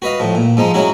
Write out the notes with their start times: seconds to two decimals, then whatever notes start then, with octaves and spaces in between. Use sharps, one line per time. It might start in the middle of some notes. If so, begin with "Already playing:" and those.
0.02 F#4 B4 D#5 F5
0.20 A2 F3
0.35 A#2
0.57 G#2 F3 G#3 D#4
0.74 F#3 G#3 C#4 E4 F#4